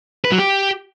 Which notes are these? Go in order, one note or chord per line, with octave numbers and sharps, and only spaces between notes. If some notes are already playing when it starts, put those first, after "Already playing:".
B4
F#3
G4